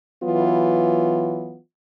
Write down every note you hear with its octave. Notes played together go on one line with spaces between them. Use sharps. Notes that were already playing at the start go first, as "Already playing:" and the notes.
E3 F#3 B3 F4